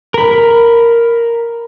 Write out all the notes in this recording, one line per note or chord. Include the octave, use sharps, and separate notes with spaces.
A#4 B5